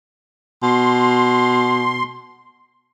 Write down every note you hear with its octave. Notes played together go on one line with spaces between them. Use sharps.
B2 C6